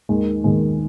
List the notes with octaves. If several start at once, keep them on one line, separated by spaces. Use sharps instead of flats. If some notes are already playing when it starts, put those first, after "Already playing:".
D#2 D#3 G#3
D#2 D#3 G#3